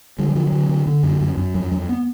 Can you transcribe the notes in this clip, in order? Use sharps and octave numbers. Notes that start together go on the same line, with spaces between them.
D3 G3
F#3
D3 F3
F#3
D3
D3
D3
F#2
F#2
F#2
F2 F#3
F2 F#3
B3